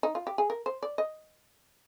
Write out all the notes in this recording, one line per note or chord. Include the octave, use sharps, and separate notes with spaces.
D#4
F4
G4
G#4
A#4
C5
D5
D#5